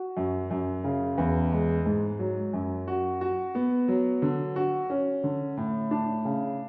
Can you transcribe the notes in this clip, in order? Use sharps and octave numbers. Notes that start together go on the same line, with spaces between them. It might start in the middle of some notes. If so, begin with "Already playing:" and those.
Already playing: F#4
F#2
F#2
C#3
E2
G#3
G#2
F#3
F#2
F#4
F#4
B3
F#3
D3
F#4
C#4
D3
A2
D4
C#3